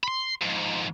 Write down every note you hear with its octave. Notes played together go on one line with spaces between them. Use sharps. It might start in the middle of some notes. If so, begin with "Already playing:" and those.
B5 C6
F2 G#2